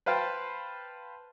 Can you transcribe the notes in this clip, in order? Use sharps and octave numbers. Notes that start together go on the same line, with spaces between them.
B4 C5 F5 G5 A5